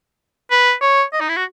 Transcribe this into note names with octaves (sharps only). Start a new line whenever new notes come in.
B4
C#5
D#5
D#4
E4
F#4